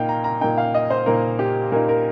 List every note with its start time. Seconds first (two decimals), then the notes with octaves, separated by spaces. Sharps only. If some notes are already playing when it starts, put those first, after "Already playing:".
Already playing: A#2 A#3 D#4 F5 G5
0.09 A#5
0.24 A#5
0.41 A#2 A#3 D#4 G5
0.58 F5
0.74 D#5
0.90 C5
1.06 A#2 A#3 D#4 A#4
1.39 G4
1.72 A#2 A#3 D#4 A#4
1.89 A#4